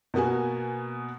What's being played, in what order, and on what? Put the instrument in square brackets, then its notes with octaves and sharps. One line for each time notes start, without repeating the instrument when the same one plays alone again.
[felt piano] B2 A#3 B3 F#4 G#5